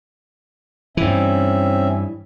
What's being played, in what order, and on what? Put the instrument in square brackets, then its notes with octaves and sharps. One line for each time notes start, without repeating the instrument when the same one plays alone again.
[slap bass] G2 E3 [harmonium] C4 C#4 E5